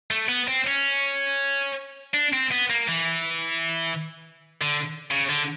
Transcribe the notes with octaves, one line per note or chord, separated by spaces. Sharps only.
A3
B3
C4
C#4
D4
C4
B3
A#3
E3
D3
C#3
D3